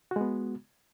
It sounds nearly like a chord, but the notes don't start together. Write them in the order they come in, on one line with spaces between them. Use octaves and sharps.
F#4 G#3 B3